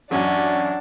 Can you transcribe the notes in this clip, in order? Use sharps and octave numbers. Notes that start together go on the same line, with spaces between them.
A1 F#2 C#4 D4 F#5